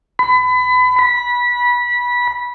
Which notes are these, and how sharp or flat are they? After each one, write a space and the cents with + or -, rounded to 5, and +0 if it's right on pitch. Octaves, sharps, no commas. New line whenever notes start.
B5 +30
B5 -20